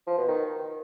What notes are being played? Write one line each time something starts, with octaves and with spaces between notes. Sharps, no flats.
F3
B2
D#3